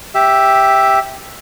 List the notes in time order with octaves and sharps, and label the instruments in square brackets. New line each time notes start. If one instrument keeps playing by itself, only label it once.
[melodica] G4 E5